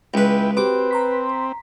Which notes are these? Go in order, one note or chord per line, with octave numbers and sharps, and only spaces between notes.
C#2 E4 B4 G5
C4 F#4 G4 B4 D6
A#5 C6 B6